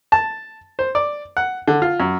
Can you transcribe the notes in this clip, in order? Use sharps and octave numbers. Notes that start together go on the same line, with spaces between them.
A5
C5
D5
F#5
D3
F4
F#2